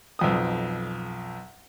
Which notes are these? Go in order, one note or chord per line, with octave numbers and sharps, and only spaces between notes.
B1 F2 D#6